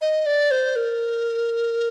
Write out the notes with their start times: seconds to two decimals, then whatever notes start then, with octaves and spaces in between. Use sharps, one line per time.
0.01 D#5
0.26 D5
0.51 C5
0.76 A#4